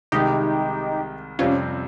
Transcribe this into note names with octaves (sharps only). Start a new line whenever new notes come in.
C2 C3 D#3 G#3 D#4 G4
F2 C3 G3 C4 C#4 F4